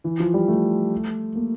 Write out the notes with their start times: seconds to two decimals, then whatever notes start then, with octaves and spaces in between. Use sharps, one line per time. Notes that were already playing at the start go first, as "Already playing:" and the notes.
0.04 E3
0.20 F3
0.34 G3
0.48 A3
1.35 A#3